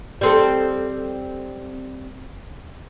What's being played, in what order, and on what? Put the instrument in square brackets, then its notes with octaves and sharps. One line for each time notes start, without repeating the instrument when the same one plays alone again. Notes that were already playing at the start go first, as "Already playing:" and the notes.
[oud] G3 C4 A4